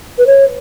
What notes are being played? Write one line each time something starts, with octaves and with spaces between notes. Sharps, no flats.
B4
C#5